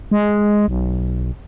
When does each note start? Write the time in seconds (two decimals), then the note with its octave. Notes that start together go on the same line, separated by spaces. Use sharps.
0.11 G#3
0.68 B1